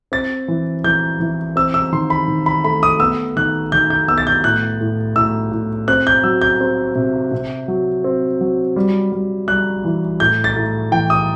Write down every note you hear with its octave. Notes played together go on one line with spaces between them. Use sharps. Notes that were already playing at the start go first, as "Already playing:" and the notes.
C4 A6
E3
E3 G6
E3
C4 E6
E6
D#3 C6
B5
D#3
B5
A3 B5
D#6
B3 E6
D#3 F#6
D#3 G6
G6
B3 E6
A6
G6
A2 F#6
A2
A2 E6
A2
C4 F#6
G6
F#3 E6
G6
C4
C3
C3
F#3
C4
F#3
G3
G3
G3 F#6
E3
A2 G6
A6
A2
E3 G5
D#6